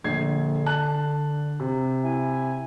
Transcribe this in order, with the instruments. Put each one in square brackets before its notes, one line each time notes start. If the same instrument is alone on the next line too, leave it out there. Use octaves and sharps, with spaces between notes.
[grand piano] A#1 G#6 C7 [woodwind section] D3
[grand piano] A5 F#6
C3
[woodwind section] E4 G#5